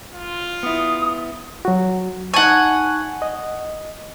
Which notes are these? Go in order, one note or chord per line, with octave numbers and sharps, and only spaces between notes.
F4
B3 E4 D#6
F#3 F#4
D#4 F#5 G#5 A5 C#6
D#5